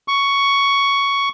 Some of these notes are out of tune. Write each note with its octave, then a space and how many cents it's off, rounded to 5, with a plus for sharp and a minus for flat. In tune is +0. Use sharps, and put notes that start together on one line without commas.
C#6 +10